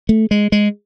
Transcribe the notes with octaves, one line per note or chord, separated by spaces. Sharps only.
A3
G#3
G#3